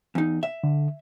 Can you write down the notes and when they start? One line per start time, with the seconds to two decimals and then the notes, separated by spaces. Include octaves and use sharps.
0.15 E2 D#4
0.43 E5
0.64 D3